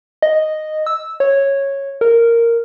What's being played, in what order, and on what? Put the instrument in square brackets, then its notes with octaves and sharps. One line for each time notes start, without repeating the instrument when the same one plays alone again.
[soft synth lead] D#5
E6
C#5
A#4